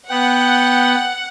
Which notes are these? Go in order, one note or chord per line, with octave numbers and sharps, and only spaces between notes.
B3 F#5 G5